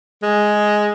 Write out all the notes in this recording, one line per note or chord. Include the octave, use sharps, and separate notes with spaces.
G#3